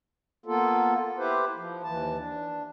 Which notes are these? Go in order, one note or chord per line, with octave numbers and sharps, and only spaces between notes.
A#3 B3 F4 A4
E4 G4 B4 C5
F3
D#2 E3 A5
D4